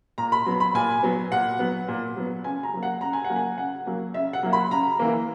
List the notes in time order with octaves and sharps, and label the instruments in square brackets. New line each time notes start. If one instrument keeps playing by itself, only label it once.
[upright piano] A#2 A#5
B5
F#3 B3
B5
A#2 G#5
F#3 B3
A#2 F#5
F#3 B3
A#2
F#3 B3
C#3 G#5
A#5
F#3 A#3
F#5
C#3 A#5
G#5
F#5
F#3 A#3
G#5
C#3 F#5
F#3 A#3
C#3 E5
F#5
F#3 A#3
B5
C#3 A#5
E3 A#3